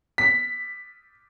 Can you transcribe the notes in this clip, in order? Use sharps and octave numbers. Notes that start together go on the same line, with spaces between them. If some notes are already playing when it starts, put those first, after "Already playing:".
B6